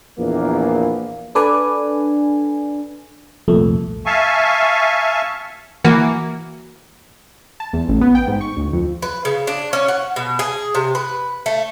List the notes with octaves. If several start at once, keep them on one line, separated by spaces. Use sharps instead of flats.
A#1 E2 A#3
D4 A4 B4 D5 G#5
C2 F2 A#2 A3
E5 F5 G#5 A5 C#6
E3 A#3 F#4
A5
E2
A1
B3
G5
G#2
C#6
D2
F2
B4
C#3
D4
C#4
F#5
B2
G#4
C3
B4
A3